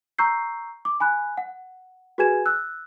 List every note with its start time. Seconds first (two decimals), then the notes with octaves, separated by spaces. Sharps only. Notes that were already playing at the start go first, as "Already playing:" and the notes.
0.19 A#5 C#6 E6 G6 C7
0.85 D6
1.00 G#5 B5 F#6
1.37 F#5
2.18 F#4 G#4 B4 G#5 G#6 E7
2.46 E6 F#6